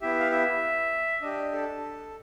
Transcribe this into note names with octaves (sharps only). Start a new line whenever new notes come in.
B3 E4 G4 E5
F5
E5
D4 G4 D#5
A4